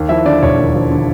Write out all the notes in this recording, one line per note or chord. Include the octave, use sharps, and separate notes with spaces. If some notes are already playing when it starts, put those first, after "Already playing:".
Already playing: D#2
F3 E4 E5
D3 D5
E1 C#5
D#2
F3
D3